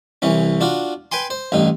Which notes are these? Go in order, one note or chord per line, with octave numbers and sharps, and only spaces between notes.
C2 E3 C#4
D4 F4 F#4
B4 G5 G#5 C6
C5
A1 G2 D#4